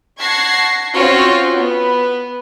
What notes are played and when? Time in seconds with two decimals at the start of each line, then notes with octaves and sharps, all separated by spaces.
0.19 F#5 A5 C#6 G#6 A#6 C7
0.94 C4 C#4 F4 F#4 C#5
1.57 B3